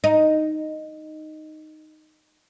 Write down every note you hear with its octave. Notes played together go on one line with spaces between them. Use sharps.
D#4